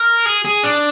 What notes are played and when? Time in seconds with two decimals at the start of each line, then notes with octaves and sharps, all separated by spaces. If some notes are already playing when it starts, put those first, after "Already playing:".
Already playing: A#4
0.26 G#4
0.45 G#4
0.63 D4